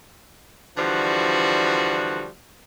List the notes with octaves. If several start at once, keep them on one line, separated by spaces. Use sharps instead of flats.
D3 E3 F3 G3 F#4